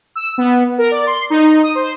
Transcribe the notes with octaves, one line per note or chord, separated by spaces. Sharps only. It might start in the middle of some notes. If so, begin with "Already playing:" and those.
E6
B3
A#4
D5
C6
D#4
D#6
C5